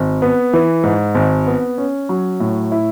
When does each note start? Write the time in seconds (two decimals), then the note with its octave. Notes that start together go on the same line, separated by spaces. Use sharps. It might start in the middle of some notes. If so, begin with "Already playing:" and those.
Already playing: G#1
0.22 B3
0.53 E3
0.83 G#2
1.15 G#1
1.47 B3
1.78 C#4
2.09 F#3
2.40 A2
2.72 E4